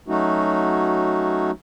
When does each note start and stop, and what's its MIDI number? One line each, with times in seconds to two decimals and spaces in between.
0.08 1.51 54
0.08 1.51 57
0.08 1.51 61
0.08 1.51 63
0.08 1.51 66